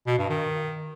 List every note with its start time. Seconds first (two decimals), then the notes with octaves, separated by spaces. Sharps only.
0.07 B2
0.18 G2
0.29 D#3